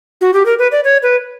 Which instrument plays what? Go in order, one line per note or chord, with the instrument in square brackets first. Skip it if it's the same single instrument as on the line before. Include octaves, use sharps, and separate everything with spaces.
[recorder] F#4
G4
A#4
B4
D5
C#5
B4